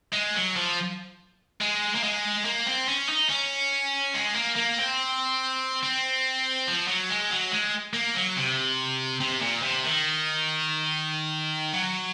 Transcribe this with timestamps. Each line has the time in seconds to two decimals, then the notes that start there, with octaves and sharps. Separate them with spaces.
0.13 G#3
0.35 F#3
0.56 F3
1.61 G#3
1.95 A#3
2.04 G#3
2.45 A#3
2.66 C4
2.88 C#4
3.09 D#4
3.29 C#4
4.14 G#3
4.35 A#3
4.56 A#3
4.78 C4
5.83 C4
6.68 F3
6.88 F#3
7.09 G#3
7.30 F#3
7.51 G#3
7.94 A#3
8.14 F#3
8.36 C3
9.20 C3
9.41 A#2
9.62 C3
9.84 D#3
11.73 F#3